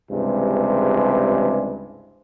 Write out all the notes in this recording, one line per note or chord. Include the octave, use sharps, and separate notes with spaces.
C#2 G2 C3 E3 G#3